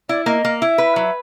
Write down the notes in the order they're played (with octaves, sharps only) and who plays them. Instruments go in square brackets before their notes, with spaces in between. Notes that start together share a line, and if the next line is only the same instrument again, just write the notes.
[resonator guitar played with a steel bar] E4 [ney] D5
[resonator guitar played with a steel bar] A#3 [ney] D#5
[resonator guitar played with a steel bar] A#3
[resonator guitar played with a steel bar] E4 [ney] E5
[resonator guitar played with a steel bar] B4
F#3